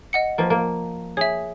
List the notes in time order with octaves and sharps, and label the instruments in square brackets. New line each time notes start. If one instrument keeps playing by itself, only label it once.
[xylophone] D#5 F#5 C#7
[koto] F3 A#3
A#3
[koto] G#4 [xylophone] C#5 E5